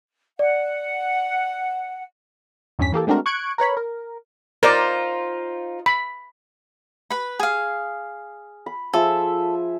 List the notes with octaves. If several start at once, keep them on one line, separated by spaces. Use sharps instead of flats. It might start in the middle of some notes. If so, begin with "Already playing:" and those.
D5 F#5
E2 G2 C#4 B6
E3 A#3 G4 A4
G#3 A3 C4 D4 F#4 A#4
C#6 F#6 G#6 C#7 D7
A#4 B4 C#5 B5
A#4
D#4 F4 A#4 C5 D5
B5
B4 B5
G#4 F5
B5
F3 G#4 A4 E5